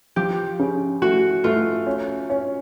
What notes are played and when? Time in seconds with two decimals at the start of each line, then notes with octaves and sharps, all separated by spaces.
0.16 F3 G4
0.59 C#3
1.02 A3 F#4
1.44 A3 F4
1.87 C#4
2.30 C#4